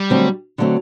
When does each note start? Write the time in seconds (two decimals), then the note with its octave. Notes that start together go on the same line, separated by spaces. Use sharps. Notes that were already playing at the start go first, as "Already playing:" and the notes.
Already playing: G3
0.10 D3 F#3 A3 C4
0.58 D3 F#3 A3 C4